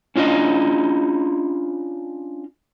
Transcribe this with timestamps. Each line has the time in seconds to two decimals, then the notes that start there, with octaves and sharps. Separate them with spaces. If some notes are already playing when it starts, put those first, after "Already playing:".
0.16 C#4 D4 F4 D#5